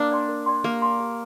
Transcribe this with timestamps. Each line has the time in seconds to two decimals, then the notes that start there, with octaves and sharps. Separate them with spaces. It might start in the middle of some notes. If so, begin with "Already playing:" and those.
Already playing: A#3 D4
0.12 D5 G5 C6
0.29 A#4
0.46 D5 G5 C6
0.64 A#3 G4
0.82 D5 G#5 C6
0.99 G4